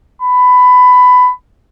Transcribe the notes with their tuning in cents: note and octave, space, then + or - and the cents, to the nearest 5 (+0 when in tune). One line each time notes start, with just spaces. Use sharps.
B5 +15